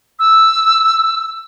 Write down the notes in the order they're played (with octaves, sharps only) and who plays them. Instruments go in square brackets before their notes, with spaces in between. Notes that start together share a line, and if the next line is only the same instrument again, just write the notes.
[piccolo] E6